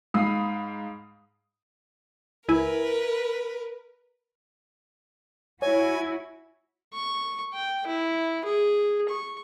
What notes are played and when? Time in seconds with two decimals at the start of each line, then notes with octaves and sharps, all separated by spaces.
0.14 G#2 F5 B5 D#6 C7
2.48 C#2 E4 A#4 B4 G#5
5.62 E4 F#4 C#5 G#5
6.94 C#6
7.53 G5
7.87 E4
8.44 G#4
9.09 C#6